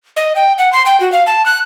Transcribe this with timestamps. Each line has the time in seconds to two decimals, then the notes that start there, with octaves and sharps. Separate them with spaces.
0.16 D#5
0.36 G5
0.58 F#5
0.73 C6
0.86 G5
1.00 F#4
1.12 F5
1.27 A5
1.46 F#6